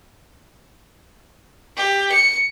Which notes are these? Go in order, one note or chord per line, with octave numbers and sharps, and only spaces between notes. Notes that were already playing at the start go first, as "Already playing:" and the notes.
G4
C#7